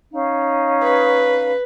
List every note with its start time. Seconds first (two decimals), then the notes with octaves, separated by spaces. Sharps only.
0.12 C#4 D#4 F5
0.84 B4